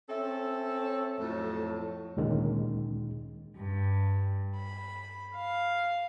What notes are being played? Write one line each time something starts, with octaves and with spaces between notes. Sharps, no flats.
C4 C#4 A4 E5
F2 A2 F#3 A3 A4
D2 A#2 D#3 G#3 C#4
G2
B5
F5